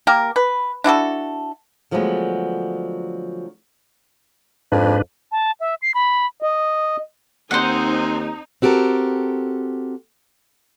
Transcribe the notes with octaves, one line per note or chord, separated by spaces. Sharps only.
A#3 G4 A#4
B4
D4 E4 F#4 A4
D3 F3 F#3 G#3 A3 B3
F2 G#2 D4 B4
A5
E5
C7
B5
D#5
D#2 C4 D#4 C5 F#5 G#5
C4 F#4 G4 A4 A#4